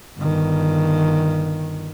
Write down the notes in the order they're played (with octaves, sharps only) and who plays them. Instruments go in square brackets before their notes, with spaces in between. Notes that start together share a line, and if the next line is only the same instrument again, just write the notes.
[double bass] G1 D#3